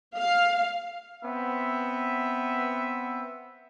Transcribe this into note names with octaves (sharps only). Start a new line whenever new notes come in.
F5
B3 C4 E5